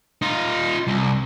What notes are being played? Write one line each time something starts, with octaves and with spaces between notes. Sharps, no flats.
D#4 F4
C2